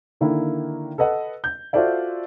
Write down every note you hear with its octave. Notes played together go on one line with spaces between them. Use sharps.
D3 D#3 A#3 E4
A4 B4 D#5 F#5
G6
F4 F#4 A4 C5 D5 E5